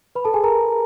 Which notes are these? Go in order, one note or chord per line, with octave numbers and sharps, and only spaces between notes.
B4 B5
A4 A5
G#4 G#5
A#4 A#5